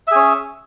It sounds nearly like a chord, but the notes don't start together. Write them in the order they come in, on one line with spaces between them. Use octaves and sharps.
E5 G#4 C#4